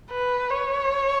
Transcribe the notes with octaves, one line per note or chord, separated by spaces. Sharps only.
B4
C#5